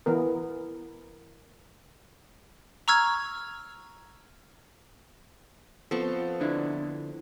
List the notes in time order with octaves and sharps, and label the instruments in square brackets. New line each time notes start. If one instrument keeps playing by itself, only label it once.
[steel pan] E3 B3 A#4
[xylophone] A#5 C#6 E6 F6 G#6
[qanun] F3 C4 C#6 [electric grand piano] B3 F4 A4
[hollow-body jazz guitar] D3 D4 E4